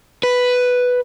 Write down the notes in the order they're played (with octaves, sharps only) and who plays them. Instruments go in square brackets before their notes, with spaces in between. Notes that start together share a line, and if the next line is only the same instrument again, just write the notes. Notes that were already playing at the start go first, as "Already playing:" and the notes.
[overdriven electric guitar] B4